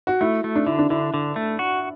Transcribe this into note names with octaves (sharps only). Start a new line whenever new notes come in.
F#4
A3 E4
A3
D4
D3 E4
D4
D3 E4
D3
A3
F#4